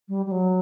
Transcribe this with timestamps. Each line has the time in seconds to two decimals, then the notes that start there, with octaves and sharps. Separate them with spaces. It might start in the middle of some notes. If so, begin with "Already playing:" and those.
0.08 G3
0.26 G3
0.31 F#3